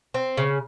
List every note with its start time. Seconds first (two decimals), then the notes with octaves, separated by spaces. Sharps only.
0.14 C4
0.37 C#3